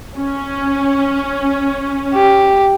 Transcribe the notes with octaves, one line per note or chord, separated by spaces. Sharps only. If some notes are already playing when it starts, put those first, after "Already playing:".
C#4
G4